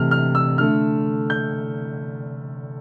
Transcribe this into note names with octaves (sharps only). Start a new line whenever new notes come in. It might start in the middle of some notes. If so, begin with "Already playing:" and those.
Already playing: C3 E3 A3 F6
F6
E6
D3 A3 F6
G6